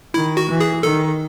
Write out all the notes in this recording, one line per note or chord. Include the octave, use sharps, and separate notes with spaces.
D#3 E4
F#4
E3
G#4
D#3 A4